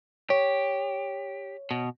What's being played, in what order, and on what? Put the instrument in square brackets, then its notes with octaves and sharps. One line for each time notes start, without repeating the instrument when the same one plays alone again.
[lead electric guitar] G4 [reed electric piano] C#5
[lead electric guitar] B2